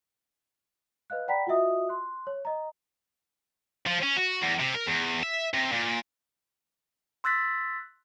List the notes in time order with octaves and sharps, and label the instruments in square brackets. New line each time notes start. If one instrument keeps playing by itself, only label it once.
[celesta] B4 D#5 F5 F#6
D5 F#5 G5 A#5 B5 B6
F4 F#4 D#5 E5 D#6
C6 F#6
C#5
D#5 A#5
[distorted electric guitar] F3
C#4
F#4
E2
C3
A#4
E2
E5
C3
A#2
[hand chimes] C6 E6 F#6 A6 B6